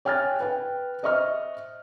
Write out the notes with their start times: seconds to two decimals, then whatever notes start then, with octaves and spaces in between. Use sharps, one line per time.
0.05 C#5 G5 G#5 F6 F#6 A6
0.40 B4 G5
1.03 C5 D#5 E5 C#6 F6